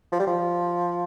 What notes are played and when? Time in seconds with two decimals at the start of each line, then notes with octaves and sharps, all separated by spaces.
0.12 F3
0.20 G3
0.27 F3